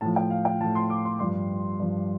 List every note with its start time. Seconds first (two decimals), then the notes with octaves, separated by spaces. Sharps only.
0.01 A2 F3 A5
0.16 G5
0.30 F5
0.45 G5
0.61 F3 A5
0.64 A2
0.75 C6
0.90 D6
1.05 C6
1.19 G2 F3 C6
1.80 G2 F3